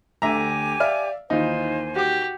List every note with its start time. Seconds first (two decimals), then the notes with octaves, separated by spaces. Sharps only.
0.22 D2 D3 G4 E5 G#5 A#5 D6
0.80 D5 E5 F5 F6
1.30 D#2 E3 D#4 F4 C5 G#5
1.96 F#4 G4 D6